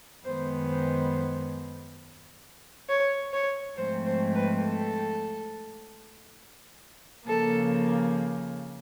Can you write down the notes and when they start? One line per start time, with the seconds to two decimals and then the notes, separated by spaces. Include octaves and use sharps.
0.24 F#2 D#3 G#3 B3 C5
0.69 C5
2.88 C#5
3.32 C#5
3.76 G#2 F3 A3 C4 C5
4.05 C5
4.35 B4
4.64 A4
7.27 C#3 F3 A#3 A4